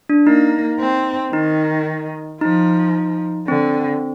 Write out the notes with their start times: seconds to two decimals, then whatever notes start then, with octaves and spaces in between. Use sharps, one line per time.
0.09 D4
0.27 A#3 D#4
0.80 C4
1.33 D#3 D#4
2.41 F3 D#4
3.48 D3 C4